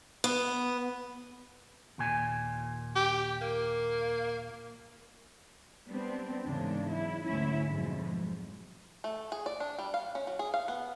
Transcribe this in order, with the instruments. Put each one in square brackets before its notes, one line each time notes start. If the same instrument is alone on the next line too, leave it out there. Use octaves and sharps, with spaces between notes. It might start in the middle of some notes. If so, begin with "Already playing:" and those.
[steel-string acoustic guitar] B3
[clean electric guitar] D#2 A#2 G#5
[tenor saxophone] G4
A#3
[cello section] G3 B3 C4 D4
E2 G#2 C#3 A#3 D4
F#3 E4
D2 G#2 C#4 E4 E5
F2 G#2 B2 F#3 G#3
[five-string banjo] A3
G#4
D5
D4
G3
F5
C#4
F#3
G#4
F5
B3